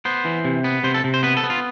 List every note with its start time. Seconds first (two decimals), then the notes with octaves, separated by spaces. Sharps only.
0.05 B3 C5
0.25 E3
0.45 C3
0.64 B3
0.84 C3 C5
0.94 A4
1.04 C3
1.14 C5
1.23 B3 B4
1.37 A4
1.44 B3
1.50 F4